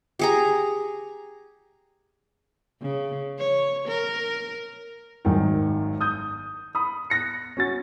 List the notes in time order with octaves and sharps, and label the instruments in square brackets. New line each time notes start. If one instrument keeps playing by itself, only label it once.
[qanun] G4 G#4 A#5
[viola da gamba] C#3
C#5
A#4
[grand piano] G#1 F#2 D#3
D#6 G6
B5 D#6
F#6 A#6 C#7
C#4 F#4 A6